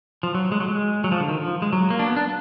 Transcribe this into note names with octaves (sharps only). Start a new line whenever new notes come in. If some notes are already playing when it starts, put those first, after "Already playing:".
F3
F#3
G#3
F#3
G#3
F#3
F3
D3
D#3
F3
G#3
F#3
A#3
D4
B3
D4